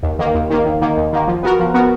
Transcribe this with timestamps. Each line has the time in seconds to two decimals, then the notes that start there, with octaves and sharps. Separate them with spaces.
0.03 D#2
0.19 D#3 A#3
0.34 D#2
0.50 D#3 A#3
0.65 D#2
0.82 D#3 A#3
0.97 D#2
1.13 D#3 A#3
1.28 F3
1.43 B3 F#4 A#4
1.59 F3
1.74 B3 F#4 A#4